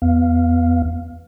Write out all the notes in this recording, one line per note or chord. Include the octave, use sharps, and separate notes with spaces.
E2 B3 F5